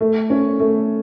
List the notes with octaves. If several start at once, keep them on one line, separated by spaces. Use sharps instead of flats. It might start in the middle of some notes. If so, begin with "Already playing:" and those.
A3
C#4
A3